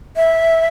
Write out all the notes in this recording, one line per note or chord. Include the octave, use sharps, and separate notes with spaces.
E5